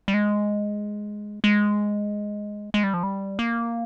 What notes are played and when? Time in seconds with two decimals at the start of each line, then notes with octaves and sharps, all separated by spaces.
0.08 G3
0.14 G#3
1.44 G#3
2.74 G#3
2.84 G3
2.94 F3
3.03 G3
3.39 A#3